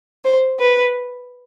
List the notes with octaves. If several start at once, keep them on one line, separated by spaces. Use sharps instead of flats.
C5
B4